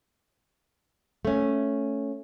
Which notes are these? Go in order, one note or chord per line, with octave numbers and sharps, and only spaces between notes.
A3 C#4